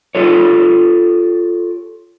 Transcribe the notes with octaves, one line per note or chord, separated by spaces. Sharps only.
F4 G4 A4 C#5